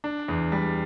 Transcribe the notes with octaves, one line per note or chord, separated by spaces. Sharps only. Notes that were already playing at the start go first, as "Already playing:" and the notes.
D4
E2
G3